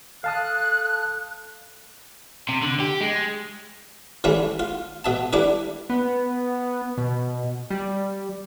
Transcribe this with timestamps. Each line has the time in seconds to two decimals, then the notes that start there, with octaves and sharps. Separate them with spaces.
0.24 A4 F5 A5 D#6 F#6
2.49 C3
2.63 D3
2.80 G4
3.01 G#3
4.24 C#3 E3 G3 A3
4.59 F4
5.04 B2 E5 A5
5.33 G3 D4 E4 B4
5.90 B3
6.98 B2
7.70 G3